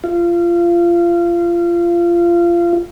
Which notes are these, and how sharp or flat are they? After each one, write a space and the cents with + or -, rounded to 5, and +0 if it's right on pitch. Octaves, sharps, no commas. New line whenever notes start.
F4 -25